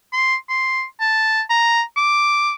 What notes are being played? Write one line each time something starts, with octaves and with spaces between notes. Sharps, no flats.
C6
C6
A5
A#5
D6